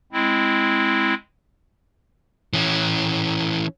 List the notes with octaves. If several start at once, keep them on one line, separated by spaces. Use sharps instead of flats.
G#3 C4 E4
E3 C#4